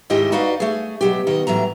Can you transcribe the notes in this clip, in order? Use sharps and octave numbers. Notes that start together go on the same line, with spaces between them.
D#2 G#2 D#3 E4 G4 D#5
D#4 F#4 B4 D5 D#5 F5
A3 G#4
B2 F#3 G4
B2 D#3 D#5
A2 E3 F#3 A#5